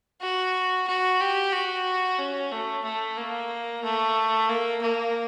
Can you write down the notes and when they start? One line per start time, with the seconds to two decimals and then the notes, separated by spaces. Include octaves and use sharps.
0.21 F#4
0.87 F#4
1.21 G4
1.52 F#4
2.19 C#4
2.52 A3
2.84 A3
3.17 A#3
3.84 A3
4.49 A#3
4.82 A#3